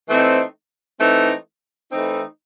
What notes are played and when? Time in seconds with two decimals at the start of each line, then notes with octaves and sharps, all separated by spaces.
0.08 E3 A3 C4 D#4
0.99 E3 A3 C4 D#4
1.90 E3 A3 C4 D#4